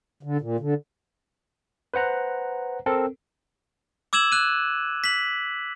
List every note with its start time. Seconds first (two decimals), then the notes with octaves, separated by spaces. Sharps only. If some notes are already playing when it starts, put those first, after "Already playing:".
0.23 D3
0.41 A#2
0.60 D3
1.94 B4 C5 F#5 A#5
2.86 C4 A4 A#4
4.13 D6 E6 G#6 E7 F#7
4.32 F#6 D#7
5.04 B6 F#7